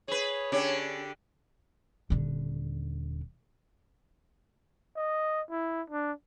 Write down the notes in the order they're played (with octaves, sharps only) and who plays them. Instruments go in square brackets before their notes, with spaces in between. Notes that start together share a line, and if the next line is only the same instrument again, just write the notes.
[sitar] G#4 B4 [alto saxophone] C#5
[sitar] D3 D4 G4 [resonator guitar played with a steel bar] C#4
[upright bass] D#1 D3
[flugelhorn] D#5
E4
D4